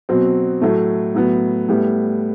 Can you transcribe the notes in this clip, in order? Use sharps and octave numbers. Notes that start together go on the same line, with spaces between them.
B2 F#3 C4
A2 F#3 A3
A2 F#3 B3
A2 G3 B3